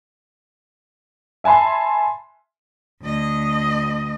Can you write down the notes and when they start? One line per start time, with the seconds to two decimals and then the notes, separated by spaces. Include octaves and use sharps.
1.44 E5 G#5 A5 B5 C6
3.02 D2 D#5